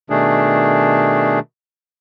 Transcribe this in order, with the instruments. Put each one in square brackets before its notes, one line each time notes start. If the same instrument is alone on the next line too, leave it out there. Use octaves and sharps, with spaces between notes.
[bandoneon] B2 D#3 A3 D4 G#4